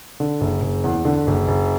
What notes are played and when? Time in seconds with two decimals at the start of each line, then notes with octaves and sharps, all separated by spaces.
0.20 D3
0.41 F#1
0.62 F#1
0.84 E2
1.05 D3
1.27 F#1
1.48 F#1